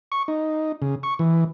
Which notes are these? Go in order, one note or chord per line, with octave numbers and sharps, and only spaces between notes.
C#6
D#4
C#3
C#6
E3